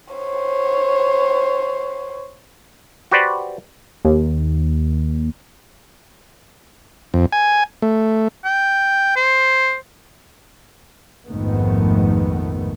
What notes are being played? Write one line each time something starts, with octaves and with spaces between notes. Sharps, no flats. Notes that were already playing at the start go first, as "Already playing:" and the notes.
C5 C#5
F#4 G4 B4 C5 D5
D#2
F2
G#5
A3
G5
C5
A#1 F2 G#2 D#3 A3 B3